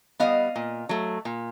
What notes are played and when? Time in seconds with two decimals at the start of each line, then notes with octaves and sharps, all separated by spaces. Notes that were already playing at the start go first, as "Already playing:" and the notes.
0.20 G3 B3 D#5 F5
0.56 A#2
0.89 F#3 A3
1.25 A#2